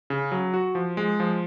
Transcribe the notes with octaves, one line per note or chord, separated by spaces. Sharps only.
C#3
F#3
F#4
F3
G#3
F3